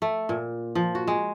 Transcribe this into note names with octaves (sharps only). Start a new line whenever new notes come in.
A3
A#2
F3
F#4
G#3